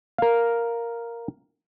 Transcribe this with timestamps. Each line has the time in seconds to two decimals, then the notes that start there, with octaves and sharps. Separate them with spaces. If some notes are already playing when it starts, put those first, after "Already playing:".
0.18 A#4 F5